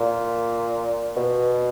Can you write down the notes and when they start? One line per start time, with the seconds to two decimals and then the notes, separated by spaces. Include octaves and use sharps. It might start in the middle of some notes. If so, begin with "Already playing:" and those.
Already playing: A#2
1.17 B2